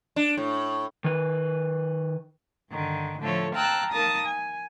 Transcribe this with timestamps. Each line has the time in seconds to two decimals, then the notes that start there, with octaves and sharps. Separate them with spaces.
0.16 D4
0.37 A2
1.04 D#3 B4
2.71 G2 D3 D#3
3.20 A2 D3 F3 A3 A4 C#5
3.54 F5 G5 A5 A#5 E6 F#6
3.91 D#3 A#3 A5 D#6 A#6
4.26 G#5